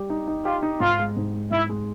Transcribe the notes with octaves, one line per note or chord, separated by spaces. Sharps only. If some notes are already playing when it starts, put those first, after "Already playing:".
Already playing: G3 G4
D#4
D#4
F4 G4
D#4
G#2 F4
G#3
G#2
G#3
G#2 E4
G#3